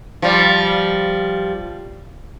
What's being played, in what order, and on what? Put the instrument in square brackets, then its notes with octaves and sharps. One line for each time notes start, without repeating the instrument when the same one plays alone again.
[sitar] F3 G3